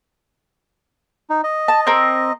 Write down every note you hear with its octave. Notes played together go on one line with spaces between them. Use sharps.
D#4
D#5
A5
C4 A#4